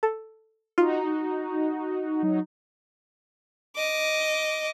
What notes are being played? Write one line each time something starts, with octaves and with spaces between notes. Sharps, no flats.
A4
D#4 F4 F#4
F#3 D#4
D#5 D6